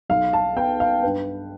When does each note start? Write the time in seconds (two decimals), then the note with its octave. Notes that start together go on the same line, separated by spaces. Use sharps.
0.09 B1 F5
0.33 A5
0.56 B3 G5
0.80 F5
1.03 G2 B4